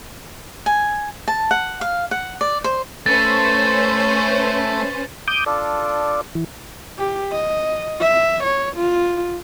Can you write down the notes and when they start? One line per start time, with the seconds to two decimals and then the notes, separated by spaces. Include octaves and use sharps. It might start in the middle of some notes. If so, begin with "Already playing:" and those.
0.66 G#5
1.28 A5
1.51 F#5
1.81 F5
2.11 F#5
2.41 D5
2.64 C5
3.06 A3 C#4 B4 C5 A6
5.28 D6 D#6 G6
5.46 D4 F4 A4 D5
6.35 E3
6.99 G4
7.32 D#5
8.01 E5
8.44 C#5
8.77 F4